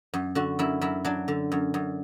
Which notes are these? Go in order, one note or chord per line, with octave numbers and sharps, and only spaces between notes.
F#2
D3 F#4
F#2 E4
F#2 E4
F#3 D4
D3
F#2
F#2